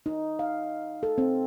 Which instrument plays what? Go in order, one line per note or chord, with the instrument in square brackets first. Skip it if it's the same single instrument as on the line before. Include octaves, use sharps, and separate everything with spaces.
[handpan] D#4
F5
A4
C4